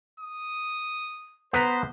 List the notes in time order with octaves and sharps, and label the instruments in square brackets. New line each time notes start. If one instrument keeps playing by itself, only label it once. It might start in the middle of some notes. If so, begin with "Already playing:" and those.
[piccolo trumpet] D#6
[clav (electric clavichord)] B3 B4 A#5 [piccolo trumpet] C5